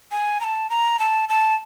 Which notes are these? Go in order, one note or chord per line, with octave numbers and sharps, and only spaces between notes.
G#5
A#5
A5
A#5
A5
A5